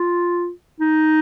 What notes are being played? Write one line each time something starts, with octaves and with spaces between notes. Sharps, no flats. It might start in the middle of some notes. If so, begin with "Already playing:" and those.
Already playing: F4
D#4